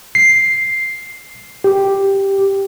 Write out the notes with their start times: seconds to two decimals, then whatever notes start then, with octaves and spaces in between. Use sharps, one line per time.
0.15 C7
1.64 G4